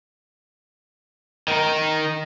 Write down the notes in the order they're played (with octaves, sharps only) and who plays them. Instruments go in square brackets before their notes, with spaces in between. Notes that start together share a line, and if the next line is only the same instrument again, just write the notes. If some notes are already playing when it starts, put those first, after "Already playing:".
[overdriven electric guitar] D#3 D#4